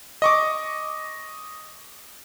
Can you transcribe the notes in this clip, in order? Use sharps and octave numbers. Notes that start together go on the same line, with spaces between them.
D#5 C#6 D6